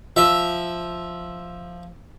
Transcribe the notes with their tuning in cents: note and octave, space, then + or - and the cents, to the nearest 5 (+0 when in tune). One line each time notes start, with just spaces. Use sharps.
F3 +0 E5 +0